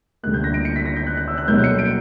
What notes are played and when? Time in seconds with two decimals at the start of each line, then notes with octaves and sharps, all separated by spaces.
0.23 D2 D3 G3 A#3 F#6
0.34 G6
0.44 A#6
0.54 D7
0.65 C#7
0.76 B6
0.86 A#6
0.96 G6
1.07 F#6
1.17 F#6
1.28 E6
1.38 F#6
1.48 B1 B2 G3 A#3 G6
1.64 C#7
1.79 D7